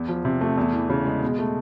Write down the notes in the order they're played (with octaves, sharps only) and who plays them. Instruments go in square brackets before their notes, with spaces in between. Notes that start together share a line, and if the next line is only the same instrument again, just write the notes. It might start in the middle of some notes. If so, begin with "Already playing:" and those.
Already playing: [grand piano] E2
F3
C3
A3
E2
E3
C#3
G#3
B2
A3